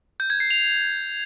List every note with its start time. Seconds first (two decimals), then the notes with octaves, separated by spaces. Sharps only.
0.20 G6
0.30 G#6
0.40 C7
0.50 F7